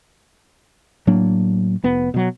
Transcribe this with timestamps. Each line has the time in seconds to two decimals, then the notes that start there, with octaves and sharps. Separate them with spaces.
1.07 A2 F#3 A#3 D4
1.84 F1 B3
2.14 B2 F#3